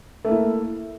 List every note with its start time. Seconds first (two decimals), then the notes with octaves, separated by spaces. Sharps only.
0.25 A3
0.28 A#3
0.31 E4